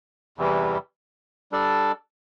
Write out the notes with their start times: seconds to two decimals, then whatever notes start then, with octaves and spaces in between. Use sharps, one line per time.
0.38 E2 C3 E3 G3
1.52 G3 D4 A4 D5